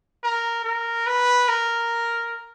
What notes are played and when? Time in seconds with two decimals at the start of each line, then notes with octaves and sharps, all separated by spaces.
0.24 A#4
0.64 A#4
1.07 B4
1.48 A#4